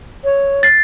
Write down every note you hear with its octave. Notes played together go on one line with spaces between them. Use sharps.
C#5
A6 C7